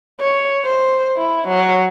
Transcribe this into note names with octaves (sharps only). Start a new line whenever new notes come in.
C#5
C5
E4
F#3